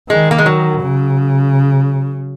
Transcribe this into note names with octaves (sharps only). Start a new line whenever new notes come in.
D#3 G#3
A#3
G#3
F#3
C#3